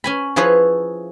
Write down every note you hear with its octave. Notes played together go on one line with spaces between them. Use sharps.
C#4 G#5 B5
F3 E4 G#4 B4 C#5